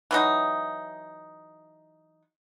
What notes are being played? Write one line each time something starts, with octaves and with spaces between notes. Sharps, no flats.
E3 F#3 D#4